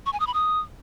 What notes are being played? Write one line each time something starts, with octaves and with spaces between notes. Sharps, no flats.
C#6
G#5
D#6
B5
D#6